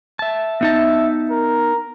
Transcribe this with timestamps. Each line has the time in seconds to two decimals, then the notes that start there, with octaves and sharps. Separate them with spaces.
0.19 E5 A5
0.61 B3 D#4 E5 A5
1.31 A#4